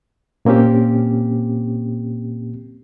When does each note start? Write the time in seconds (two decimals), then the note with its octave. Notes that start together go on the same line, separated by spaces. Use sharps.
0.45 A#2 A#3 C4 C#4 G4